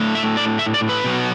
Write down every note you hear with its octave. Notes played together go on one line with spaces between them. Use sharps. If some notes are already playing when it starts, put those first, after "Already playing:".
Already playing: A2 A3 D4
E5
D5
E5
D5
B4
B2 F#3 B3